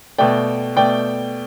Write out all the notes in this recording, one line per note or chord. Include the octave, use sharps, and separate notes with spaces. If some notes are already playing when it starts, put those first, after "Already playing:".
B2 A3 D5 G5
B2 A3 D5 G5